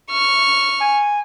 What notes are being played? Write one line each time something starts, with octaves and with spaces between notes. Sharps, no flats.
C#6 F6
G#5